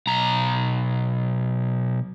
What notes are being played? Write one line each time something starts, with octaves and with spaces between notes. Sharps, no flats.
B1 A#5